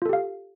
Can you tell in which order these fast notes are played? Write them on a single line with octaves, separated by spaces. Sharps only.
F4 A4 G4 F5